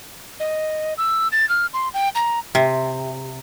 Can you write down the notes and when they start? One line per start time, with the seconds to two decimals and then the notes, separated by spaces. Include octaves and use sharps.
0.40 D#5
0.98 E6
1.32 A6
1.49 F6
1.73 C6
1.94 G5
2.15 A#5
2.55 C3